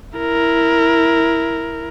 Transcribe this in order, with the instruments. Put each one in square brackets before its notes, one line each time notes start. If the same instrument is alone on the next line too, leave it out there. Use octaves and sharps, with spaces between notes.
[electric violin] E4 A#4